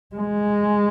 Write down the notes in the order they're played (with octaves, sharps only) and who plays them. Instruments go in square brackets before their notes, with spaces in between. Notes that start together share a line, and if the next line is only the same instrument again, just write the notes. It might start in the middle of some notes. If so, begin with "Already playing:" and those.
[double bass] G#3